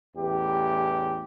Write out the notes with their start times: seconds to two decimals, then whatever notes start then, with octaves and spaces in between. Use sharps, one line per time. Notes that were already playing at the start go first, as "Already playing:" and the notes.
0.16 A1 E2 G4